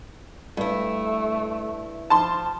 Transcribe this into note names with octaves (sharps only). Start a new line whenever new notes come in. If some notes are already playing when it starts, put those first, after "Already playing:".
G2 A3 E4
F3 A5 C6